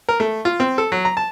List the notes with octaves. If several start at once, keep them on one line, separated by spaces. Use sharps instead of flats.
A#4
A3
F4
C4
A4
F#3
A#5
A5